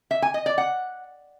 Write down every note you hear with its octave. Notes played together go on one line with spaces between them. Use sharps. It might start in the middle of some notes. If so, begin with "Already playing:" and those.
E5
G#5
D#5
D5
F#5